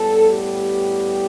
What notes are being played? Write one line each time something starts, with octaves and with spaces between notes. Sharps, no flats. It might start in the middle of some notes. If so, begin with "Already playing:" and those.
Already playing: A2 G3 B3 A4
G4